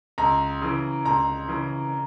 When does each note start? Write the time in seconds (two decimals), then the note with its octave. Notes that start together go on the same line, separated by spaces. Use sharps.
0.18 C#2 A#5
0.61 C#3 E3
1.05 C#2 A#5
1.48 C#3 E3